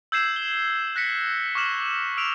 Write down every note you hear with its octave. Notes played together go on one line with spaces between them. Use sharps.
E6 G6 G#6 C7 E7 F#7
G7
F#6 A#6 B6 C#7
C#6 D6 F6 E7 F#7
E6 F6 D7 F7